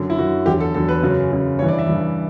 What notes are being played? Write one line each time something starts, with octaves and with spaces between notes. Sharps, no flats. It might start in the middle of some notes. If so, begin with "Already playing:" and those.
Already playing: F#2 D3 F#3
E4
F#2 D3 F#3 F#4
E2 D3 F#3 G4
A4
E2 D3 F#3 A4
B4
F#2 C#3 F#3
F#2 C#3 F#3
G2 E3 C#5
D5
E5
G2 E3